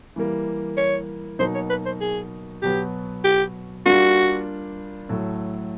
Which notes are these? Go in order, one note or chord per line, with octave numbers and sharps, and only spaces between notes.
E3 G3 A#3
C#5
B2 F#3 A#3 D#4 C5
C#5
B4
C5
G#4
B2 F#3 B3 G4
G4
G3 A#3 D4 F4 F#4
A2 F#3 A3